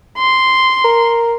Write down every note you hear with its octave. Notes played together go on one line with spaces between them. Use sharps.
C6
A#4